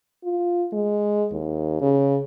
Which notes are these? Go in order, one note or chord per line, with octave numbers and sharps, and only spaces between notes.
F4
G#3
D#2
C#3